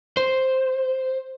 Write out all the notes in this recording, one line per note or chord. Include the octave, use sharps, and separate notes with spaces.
C5